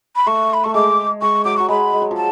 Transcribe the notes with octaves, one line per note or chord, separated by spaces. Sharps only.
B5
A3 C#6
B5
A3 C#6
G#3 D6
G#3 C#6
F#3 D6
F#3 C#6
G#3 B5
G#3
F#3
F3 A5